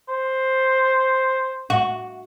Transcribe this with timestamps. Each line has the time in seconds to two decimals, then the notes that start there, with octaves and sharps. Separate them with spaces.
0.09 C5
1.70 F#4